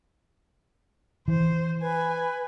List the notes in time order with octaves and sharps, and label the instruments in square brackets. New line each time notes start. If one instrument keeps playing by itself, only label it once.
[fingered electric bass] E3 [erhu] C5
[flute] B4 [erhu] G#5